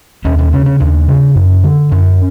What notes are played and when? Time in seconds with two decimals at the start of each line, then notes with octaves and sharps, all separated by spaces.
0.25 D#2 C#4
0.38 C#4
0.52 C#3 C#4
0.66 C#4
0.80 D#2 D4
1.08 C#3
1.35 F#2
1.64 D3
1.91 F#2 C#4